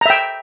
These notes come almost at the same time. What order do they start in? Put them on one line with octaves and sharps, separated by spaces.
A#5 E5 G5